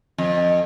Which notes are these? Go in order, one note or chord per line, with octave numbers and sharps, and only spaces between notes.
F2